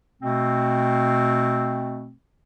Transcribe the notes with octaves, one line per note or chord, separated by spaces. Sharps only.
B2 A3 C4